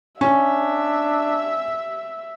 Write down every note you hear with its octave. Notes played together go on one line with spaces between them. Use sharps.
C#4 D4 E5